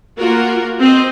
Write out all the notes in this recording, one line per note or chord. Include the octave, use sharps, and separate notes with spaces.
A#3 F4 F#4 A#4
C4 C5 D#5